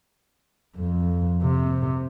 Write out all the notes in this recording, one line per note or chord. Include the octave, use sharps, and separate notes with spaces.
F2
C3